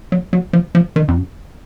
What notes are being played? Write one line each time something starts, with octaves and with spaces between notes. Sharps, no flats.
F#3
F#3
F3
F3
D#3
F2
F#2